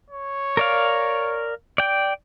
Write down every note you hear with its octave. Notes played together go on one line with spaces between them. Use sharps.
C#5
A#4 D5 F5
D5 G5